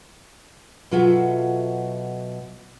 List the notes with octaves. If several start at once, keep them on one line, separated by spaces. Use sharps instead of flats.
B2 F#3 F4 A4 E5